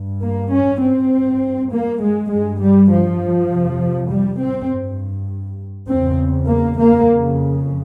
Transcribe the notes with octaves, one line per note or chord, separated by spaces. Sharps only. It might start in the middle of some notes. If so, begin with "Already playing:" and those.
Already playing: G2
A#3
C#4
C4
G2
A#3
G#3
G2 G#3
G3
F3
F2 C3
G3
C4
G2
E2 C#3 C4
A#3
A#3
F2 C#3